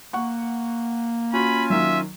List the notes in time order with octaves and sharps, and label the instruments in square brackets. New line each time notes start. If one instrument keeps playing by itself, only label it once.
[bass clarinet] A#3 [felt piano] F#5 C#6
[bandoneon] C#4 F4 G#5 [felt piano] F#4 [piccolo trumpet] B5
[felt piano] D#3 F#3 [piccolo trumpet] E5